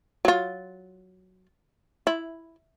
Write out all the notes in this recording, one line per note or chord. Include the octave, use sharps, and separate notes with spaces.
F#3 F4
E4